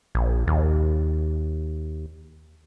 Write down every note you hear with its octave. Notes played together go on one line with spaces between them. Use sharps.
A#1
D#2